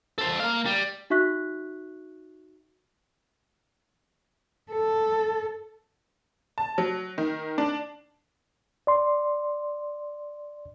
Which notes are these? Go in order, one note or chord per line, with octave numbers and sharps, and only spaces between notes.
A4 C5
A#3 F5
G3
D#4 F#4 E5 C#6 F#6 B6
A4
A5
F#3
D#3
D4
D5 C6